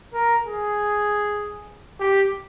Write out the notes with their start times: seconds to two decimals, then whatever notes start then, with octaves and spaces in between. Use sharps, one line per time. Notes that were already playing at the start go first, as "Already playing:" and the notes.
0.13 A#4
0.44 G#4
2.00 G4